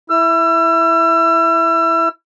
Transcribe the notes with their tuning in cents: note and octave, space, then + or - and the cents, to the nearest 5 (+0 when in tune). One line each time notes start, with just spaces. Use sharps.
E4 +0 E6 +35